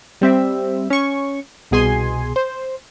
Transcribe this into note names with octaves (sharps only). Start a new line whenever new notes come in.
G3 C4 E5
C#4 C#6
C2 B2 G#4 G#5 C6
C5